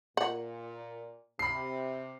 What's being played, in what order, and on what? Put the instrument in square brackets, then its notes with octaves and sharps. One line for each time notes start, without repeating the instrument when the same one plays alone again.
[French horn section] A#2 [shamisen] F#5
[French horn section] C3 [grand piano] B5 C7